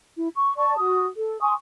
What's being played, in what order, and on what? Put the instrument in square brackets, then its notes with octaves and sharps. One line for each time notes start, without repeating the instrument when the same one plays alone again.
[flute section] E4
C#6
D5 A5 C#6
F#4 D#6
A4
G#5 C6 C#6 D#6